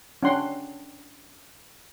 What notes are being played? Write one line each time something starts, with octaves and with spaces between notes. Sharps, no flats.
C#4 D4 F#5 G5 C6